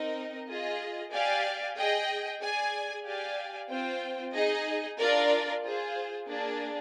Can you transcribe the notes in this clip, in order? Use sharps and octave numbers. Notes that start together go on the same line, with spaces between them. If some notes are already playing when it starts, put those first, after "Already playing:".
Already playing: C4 D#4 A#4 D#5
F4 G#4 D#5
G4 D5 F5 G#5
G#4 D#5 G5
G#4 D5 G#5
G4 D5 F5 G#5
C4 F4 C5 G5
D#4 G#4 D#5
D4 F4 A#4 D5
F4 G#4 C5
A#3 D4 G#4 D5